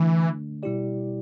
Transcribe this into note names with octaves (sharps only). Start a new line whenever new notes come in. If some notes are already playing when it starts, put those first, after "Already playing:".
Already playing: D3 E3 A3 D4
B2 G3 E4 G4 D5